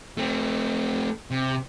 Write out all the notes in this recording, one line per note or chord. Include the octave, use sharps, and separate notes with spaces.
A3 C4
C3